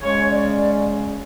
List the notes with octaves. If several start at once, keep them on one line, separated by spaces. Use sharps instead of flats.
C#3 G#3 C#4 C#5
D5